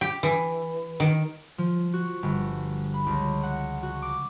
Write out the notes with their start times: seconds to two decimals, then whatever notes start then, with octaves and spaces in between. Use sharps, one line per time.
0.01 G4
0.23 E3
1.00 D#3
1.58 F3
1.94 F#4
2.23 G1
2.94 B5
3.06 C#2
3.43 F#5
3.83 F#4
4.02 D6